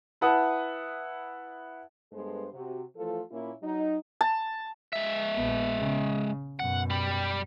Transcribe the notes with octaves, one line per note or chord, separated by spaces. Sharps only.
E4 B4 E5 F#5 A5 D#6
G2 G#3 B3 A4 C5
C3 F#4
E3 F3 A3 F4 A4
A#2 A#3 C#4 E4
F#3 D#4
A5
G#3 E5
A#1 B3
C#3
F#2 B2 F#5
G3 B5